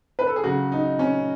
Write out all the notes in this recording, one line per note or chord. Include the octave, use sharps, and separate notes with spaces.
B4
A4
G#4
C#3 F#3 F#4
D#4
C#4